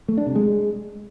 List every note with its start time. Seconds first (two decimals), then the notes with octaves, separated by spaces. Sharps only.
0.08 A3
0.17 D4
0.26 C3
0.35 G#3